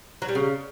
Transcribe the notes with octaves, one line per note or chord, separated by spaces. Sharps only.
F#3
G3
C#3